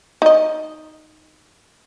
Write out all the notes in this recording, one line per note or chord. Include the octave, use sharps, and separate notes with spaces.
D#4 D#5